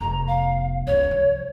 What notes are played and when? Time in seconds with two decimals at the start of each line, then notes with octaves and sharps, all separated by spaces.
0.01 F1 B3 A#5
0.27 F5
0.87 C#2 F#2 C#5
1.11 C2 F3